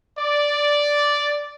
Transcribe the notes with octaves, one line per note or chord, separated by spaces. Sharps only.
D5